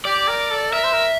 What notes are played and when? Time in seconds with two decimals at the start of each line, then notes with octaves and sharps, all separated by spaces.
0.05 G4 D5
0.28 A#4
0.51 A4
0.73 A#4 E5
0.84 C5
0.93 A#4